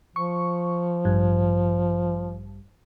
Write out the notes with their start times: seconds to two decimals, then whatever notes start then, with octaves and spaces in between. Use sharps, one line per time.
0.16 F3 C#6
1.05 A1 G2